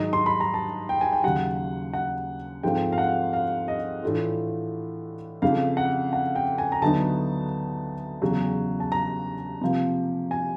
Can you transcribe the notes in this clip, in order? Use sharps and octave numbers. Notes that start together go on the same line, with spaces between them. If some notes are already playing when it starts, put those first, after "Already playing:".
Already playing: G#2 D#3 F#3 D#5
C6
B5
A#5
A5
G5
G#5
G5
D#2 C#3 F#3 F#5
F#5
G#2 F3 A3 C4 F4 G5
F5
F#5
F5
D#5
A2 E3 A3 D4 F4
F2 C#3 F3 F5
F#5
F#5
G5
G#5
A#5
D2 D3 F#3 B3 D#4 A5
E2 C#3 F#3
A5
A#5
C3 F3 A#3
G#5